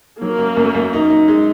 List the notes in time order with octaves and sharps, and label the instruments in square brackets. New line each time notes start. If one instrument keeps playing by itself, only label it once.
[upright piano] F#3 [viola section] A#3
[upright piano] F#2
F#2
F#2
D#4
D#4
G#3